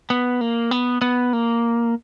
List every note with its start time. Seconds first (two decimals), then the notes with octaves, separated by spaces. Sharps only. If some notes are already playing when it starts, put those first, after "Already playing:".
0.10 B3
0.41 A#3
0.71 B3
1.02 B3
1.33 A#3